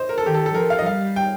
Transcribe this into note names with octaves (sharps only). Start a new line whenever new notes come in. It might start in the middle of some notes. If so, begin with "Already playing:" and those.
Already playing: C5 D#5
A#4
A4
D#3 G4
A4
A4
F3 A#4
F5
D#5
G3 F5
G5